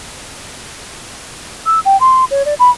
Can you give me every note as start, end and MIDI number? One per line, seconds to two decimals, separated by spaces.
1.66 1.80 88
1.85 1.99 79
2.00 2.25 84
2.30 2.45 73
2.45 2.54 74
2.59 2.70 83